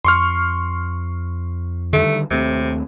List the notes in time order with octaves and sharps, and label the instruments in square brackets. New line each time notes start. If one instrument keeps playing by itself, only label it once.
[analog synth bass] F2 [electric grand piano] C6 C#6 F6
[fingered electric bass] D3 D#3 G3 [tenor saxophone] A3
[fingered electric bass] D#2 A3 C4 [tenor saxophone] C3